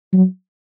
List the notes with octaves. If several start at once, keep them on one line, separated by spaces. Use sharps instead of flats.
F#3